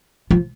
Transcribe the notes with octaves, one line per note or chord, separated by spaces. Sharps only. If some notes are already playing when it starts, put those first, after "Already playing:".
F3